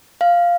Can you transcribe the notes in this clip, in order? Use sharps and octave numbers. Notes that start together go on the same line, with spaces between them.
F5